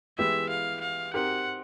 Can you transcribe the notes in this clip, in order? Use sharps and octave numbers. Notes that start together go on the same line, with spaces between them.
E3 G#3 B3 E4 G4 E5
F5
F5
C4 D#4 G4 A#4 F#5